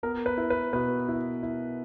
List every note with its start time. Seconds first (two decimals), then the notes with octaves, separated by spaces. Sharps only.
0.03 B3 A#4
0.26 B4
0.38 E4
0.50 B4
0.73 B2 B4
1.08 E4
1.43 E4